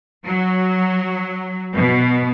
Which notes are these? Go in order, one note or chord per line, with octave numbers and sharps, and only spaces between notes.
F#3
B2